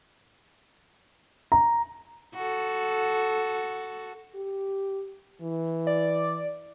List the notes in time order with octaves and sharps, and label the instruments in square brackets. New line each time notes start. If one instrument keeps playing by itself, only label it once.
[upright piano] A#5
[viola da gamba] F#4 A4
[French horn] G4
E3
[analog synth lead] D5